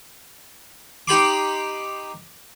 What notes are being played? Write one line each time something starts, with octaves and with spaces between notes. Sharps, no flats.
D#4 G4 G5 B5 C6 D6